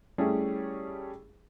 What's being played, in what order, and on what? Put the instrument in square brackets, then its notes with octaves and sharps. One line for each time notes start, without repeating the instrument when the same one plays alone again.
[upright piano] G3 A3 C#4 E4 G4 G#4